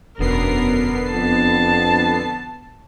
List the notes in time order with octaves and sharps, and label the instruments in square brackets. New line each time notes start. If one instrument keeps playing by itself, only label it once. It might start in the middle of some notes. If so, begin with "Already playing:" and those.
[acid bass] E1 [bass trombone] F#2 [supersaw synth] D3 B3 C7 [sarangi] A#4
[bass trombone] F2 [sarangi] A5